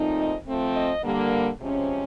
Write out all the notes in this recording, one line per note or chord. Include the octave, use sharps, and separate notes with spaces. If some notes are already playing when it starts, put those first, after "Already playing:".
Already playing: A#2 F3 A3 C4 D#4
D#5
F3 A3 C4
D#5
D3 G3 A#3
C3 F3 G#3 C#4